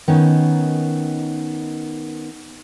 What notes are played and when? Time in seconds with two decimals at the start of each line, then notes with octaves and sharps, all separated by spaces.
0.08 D#3 B3 C#4 D#4